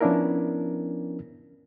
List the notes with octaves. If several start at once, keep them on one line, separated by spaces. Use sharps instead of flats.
F3 B3 C#4 D4 E4 A#4